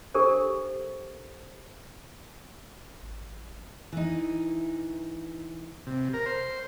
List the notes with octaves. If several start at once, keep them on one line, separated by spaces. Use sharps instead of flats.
D4 G4 A4 A#4 C5
G#1
E3 D#4
C3
A#4
C5